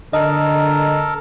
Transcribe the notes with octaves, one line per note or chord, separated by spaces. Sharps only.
D3 A4 A#4 D#5